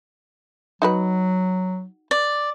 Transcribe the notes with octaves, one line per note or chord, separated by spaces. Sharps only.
F#3 D#4 F#4 B4
D5